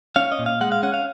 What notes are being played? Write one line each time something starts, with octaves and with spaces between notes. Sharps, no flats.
C#4 F5
D#5
A#2
F5
G#3 F#5
F5
C#4 F#5
F5